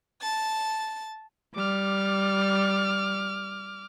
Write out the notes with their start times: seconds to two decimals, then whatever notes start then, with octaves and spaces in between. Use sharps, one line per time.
0.22 A5 A6
1.56 G3 D6 F6